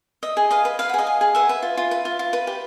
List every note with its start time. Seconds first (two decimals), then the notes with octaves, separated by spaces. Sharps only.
0.23 D#5 E5
0.37 G#4
0.51 B4 D#5 F5
0.65 B4
0.79 B4 F5
0.89 G#4 F#5
0.98 D#5 F5
1.07 G#4
1.21 G#4
1.35 B4 E5 F#5
1.49 B4
1.62 F4
1.77 F4
1.91 B4
2.05 F4
2.19 F4
2.33 B4
2.47 G4